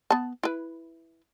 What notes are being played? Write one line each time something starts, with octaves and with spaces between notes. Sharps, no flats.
B3 A5
E4 B4